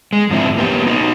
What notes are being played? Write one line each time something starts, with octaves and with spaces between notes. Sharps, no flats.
G#3
G#2 D3 F3 C4 E4
A#3 B3 G4
D#4 F#4